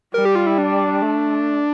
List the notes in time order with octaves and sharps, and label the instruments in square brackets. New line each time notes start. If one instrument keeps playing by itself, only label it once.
[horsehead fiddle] G3 [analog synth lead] A#4
[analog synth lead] G4
F4
E4
D4
[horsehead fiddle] A3